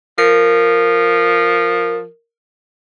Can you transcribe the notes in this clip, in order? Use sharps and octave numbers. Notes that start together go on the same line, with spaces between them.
F3 A#4